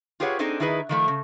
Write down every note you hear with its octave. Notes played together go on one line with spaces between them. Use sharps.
F4 G4 G#4 B4 C#5 F#5
C4 D4 D#4 G#4 A4 C5
D#3 D#4 E4 G#4 B4
D#3 F3 A3
C#3